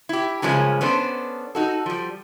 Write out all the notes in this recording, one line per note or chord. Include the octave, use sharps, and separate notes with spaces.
E4 G4
G2 C#3 F3 G#3 A#3 C#4
B3 C#4 D4 A4 C5
D#4 F#4 A4
F3 G3